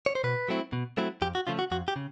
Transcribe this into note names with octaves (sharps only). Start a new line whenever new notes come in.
C#5
C5
B2 B4
F#3 A3 C4 E4
B2
F#3 A3 C4 E4
F2 G4
F#4
C#3 F3 A3 F4
F#4
F2 F#4
G4
C#3